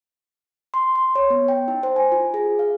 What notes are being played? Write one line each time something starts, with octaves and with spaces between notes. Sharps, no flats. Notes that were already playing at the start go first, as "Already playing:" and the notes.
C6
C6
C#5
B3
G5
D#4
C5
G#5
F4
G#4
F5